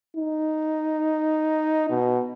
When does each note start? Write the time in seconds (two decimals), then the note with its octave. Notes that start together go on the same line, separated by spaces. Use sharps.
0.17 D#4
1.90 B2